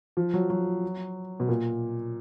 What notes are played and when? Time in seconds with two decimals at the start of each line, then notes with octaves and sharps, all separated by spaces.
0.17 F3
0.34 F#3
0.50 F#3
1.40 B2
1.49 A#2